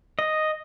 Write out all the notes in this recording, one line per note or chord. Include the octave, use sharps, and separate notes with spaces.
D#5